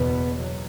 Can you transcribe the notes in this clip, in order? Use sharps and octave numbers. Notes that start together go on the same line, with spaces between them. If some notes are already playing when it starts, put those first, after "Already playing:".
Already playing: F#1 E2 B2 B3
F#3